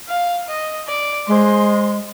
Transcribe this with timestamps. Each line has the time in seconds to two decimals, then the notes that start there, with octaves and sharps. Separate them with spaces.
0.09 F5
0.48 D#5
0.88 D5
1.28 G#3 C5